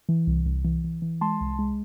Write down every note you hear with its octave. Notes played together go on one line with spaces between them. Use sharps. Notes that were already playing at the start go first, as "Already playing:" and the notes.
E3
C2
C2
E3
E3
E3
G#3 A5 C6
C2
G#3